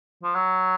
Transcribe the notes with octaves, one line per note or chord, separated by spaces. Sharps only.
F3
F#3